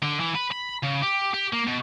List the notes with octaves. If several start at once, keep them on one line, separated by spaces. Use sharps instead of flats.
D3
E3
B4
B5
C#3
G4
G4
A#3
B2